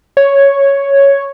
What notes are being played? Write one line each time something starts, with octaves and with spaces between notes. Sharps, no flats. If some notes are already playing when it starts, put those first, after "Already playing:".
C#5